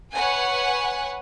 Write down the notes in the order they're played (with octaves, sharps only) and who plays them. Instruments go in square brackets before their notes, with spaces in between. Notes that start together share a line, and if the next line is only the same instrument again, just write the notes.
[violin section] B4 C#5 F#5 G#5